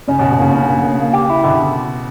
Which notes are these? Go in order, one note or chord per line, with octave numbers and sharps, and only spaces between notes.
C#3 C#4
B2
C#4
B2
C#3 A#3
D3
C#3 C#4
A#3
A#3
A#3
G4
E4
B2 D3